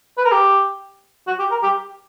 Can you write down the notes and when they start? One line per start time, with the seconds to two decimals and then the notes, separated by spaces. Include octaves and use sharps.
0.18 B4
0.25 A#4
0.32 G4
1.27 F#4
1.39 G4
1.51 A#4
1.63 G4